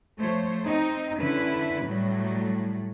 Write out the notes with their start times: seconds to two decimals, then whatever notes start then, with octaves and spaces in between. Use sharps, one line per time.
0.19 F3 A3 C5 C#5
0.66 C4 D#4
1.20 D3 C#4 E4 B4
1.86 A2 F#3 G3